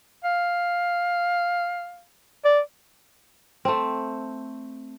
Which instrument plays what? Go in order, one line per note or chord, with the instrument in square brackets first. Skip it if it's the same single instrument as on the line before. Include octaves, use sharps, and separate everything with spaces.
[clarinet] F5
D5
[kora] A3 C4